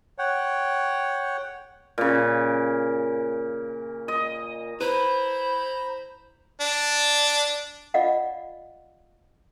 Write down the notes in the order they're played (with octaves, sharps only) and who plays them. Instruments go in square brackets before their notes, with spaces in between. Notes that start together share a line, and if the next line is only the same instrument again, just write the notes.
[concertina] C#5 F#5 G5
[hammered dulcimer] A#2 C#3
D#5
[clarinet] E4 [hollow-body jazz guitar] B4 [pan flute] C5 [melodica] A#5 B5
[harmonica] D4
[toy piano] F4 D5 D#5 F5 F#5